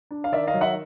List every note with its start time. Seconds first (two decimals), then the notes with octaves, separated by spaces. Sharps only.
0.11 D4
0.24 F5
0.32 D#3 D5 E5
0.48 D#5 F5
0.54 F#3
0.61 E5 F#5